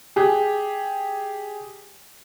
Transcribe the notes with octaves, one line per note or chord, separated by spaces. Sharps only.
G4 G#4